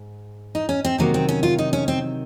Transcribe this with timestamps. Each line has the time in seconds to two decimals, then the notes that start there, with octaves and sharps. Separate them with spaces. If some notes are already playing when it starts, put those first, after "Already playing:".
Already playing: G#2
0.55 D#4
0.69 C#4
0.85 C4
0.98 C3 D#3 F#3 A#3
1.14 C4
1.29 C#4
1.43 F4
1.58 D#4
1.73 C#4
1.88 C4